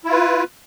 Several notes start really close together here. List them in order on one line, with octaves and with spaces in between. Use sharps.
E4 F4 B4